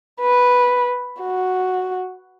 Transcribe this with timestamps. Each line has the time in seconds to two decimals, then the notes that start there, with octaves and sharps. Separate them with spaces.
0.21 B4
1.21 F#4